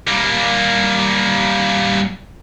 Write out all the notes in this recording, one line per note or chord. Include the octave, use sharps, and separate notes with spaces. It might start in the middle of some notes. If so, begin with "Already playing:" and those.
G3 A#3